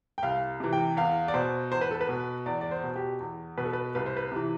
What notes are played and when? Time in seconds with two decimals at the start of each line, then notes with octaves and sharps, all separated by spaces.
0.18 G5
0.22 C2 F5
0.60 C3 E3
0.73 G5
0.97 E2 F5
1.28 D5
1.34 B2 C5
1.72 E2 C5
1.81 B4
1.91 A4
2.01 B4
2.09 B2
2.46 E2 D5
2.61 D5
2.71 C5
2.83 B2
2.96 G4
3.20 E2
3.58 B2 B4
3.65 A4
3.73 B4
3.95 C2 B4
4.06 C5
4.17 B4
4.32 C3 E3